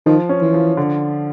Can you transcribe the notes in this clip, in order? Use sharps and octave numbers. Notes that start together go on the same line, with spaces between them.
D#3 F3
C#4
E3
F3
D3